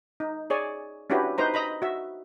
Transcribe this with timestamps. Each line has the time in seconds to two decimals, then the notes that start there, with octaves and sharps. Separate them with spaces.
0.20 D#4
0.50 G#4 C#5 D5 G#5
1.10 C#4 D4 E4 F#4 G4 B4
1.38 D#4 B4 C5 A#5
1.54 D#5 A#5 B5
1.82 F#4 E5